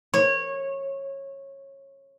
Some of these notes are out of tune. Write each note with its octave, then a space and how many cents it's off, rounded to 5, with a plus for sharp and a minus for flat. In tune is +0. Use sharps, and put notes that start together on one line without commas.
C#5 -20